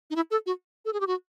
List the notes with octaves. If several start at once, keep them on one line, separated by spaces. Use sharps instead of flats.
D#4
E4
A4
F#4
A4
G#4
G4
F#4